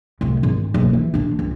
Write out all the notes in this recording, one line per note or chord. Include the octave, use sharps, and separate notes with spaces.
C2 A2
G#1
F#1 B2
E3
D#1 D4
C#2